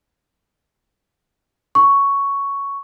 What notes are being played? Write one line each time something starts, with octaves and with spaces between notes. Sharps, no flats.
C#6